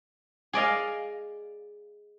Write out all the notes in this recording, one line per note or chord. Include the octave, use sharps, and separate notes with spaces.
G#4 D5 D#5 F5